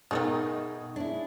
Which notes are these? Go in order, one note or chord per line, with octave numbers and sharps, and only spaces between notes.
B2 D#3 E3 A3 D#4 G#4
D4 E4